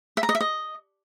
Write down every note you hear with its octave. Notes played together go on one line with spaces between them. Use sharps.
E5
A#5
D#5
E5
D#5